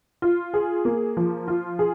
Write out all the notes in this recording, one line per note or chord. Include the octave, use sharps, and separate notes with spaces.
F4
G#4
A#3
F3
F4
G#4